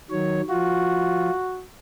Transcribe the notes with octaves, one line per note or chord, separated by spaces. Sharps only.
D#3 F#3 C#5
F3 F4 F#4